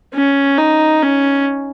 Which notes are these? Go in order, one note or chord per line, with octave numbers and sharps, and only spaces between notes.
C#4
D#4
C#4